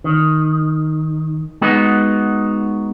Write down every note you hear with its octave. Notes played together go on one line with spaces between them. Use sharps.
D#3
G#3 B3 D#4 F#4